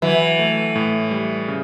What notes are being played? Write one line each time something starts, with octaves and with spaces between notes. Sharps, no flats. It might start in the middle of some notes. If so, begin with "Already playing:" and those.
E3 F#3
A3
A2
G3
C#3